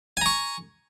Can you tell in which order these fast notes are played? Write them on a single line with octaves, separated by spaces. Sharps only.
G#5 A#5 C#6